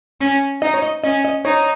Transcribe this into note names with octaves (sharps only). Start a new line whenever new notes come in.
C#4
D#4 D#5
C#5
D#5
C#4 D#5
D#5
D#4 C#5